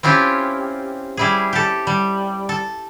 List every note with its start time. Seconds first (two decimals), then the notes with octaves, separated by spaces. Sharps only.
0.03 C4 C#4 E4 F4 G4
1.17 G3 E4 G#4
1.53 G4 A4
1.87 G3
2.49 A4